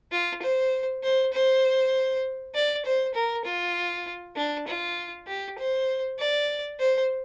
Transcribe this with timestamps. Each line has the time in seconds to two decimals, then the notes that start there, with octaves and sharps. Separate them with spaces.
0.12 F4
0.42 C5
1.03 C5
1.33 C5
2.55 D5
2.85 C5
3.14 A#4
3.45 F4
4.36 D4
4.67 F4
5.27 G4
5.58 C5
6.19 D5
6.79 C5